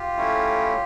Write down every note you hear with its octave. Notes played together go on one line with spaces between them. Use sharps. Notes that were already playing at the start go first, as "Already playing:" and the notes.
Already playing: F4 G4
A2 F#3 A3 C#4 E4